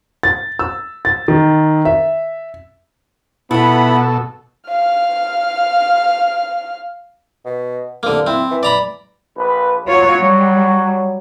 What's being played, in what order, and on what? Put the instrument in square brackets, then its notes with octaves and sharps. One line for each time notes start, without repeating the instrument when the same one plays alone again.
[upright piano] A6
E6
A6
D#3
E5
[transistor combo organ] B2 A4 [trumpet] B3 [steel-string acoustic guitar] E4 F4 [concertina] F#5 B5
[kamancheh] F5 F6
[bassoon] B2
[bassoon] C2 [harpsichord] D3 A#3
[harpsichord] C4 [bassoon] E4
[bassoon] E3
[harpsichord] D5 A#5 B5
[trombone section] A#1 B4
[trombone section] F#3 [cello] F4 C#5
[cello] G3